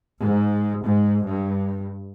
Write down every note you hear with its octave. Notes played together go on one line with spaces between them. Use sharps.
G#2
G#2
G2